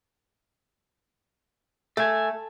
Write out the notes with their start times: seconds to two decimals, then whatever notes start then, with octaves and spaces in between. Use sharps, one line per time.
1.97 A3 A4 G#5